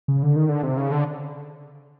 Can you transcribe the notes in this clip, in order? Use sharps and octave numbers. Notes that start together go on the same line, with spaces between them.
C#3
D3
D#3
D3
C3
C#3
D3